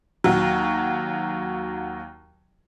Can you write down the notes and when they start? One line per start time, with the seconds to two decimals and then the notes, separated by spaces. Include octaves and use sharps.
0.24 D#2 F#3